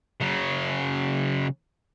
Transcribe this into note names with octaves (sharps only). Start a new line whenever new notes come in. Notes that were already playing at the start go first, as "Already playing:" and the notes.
C#3 F#3